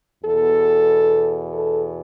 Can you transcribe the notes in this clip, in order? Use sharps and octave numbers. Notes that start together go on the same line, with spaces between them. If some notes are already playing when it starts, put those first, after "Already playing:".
E2 B2 A4
A4